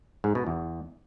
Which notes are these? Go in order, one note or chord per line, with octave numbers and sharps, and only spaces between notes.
G#2
B2
E2